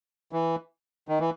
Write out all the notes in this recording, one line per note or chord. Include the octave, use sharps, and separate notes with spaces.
E3
D#3
E3